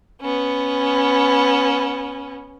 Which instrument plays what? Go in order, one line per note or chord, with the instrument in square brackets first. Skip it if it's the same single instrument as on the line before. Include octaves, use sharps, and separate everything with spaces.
[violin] B3 C#4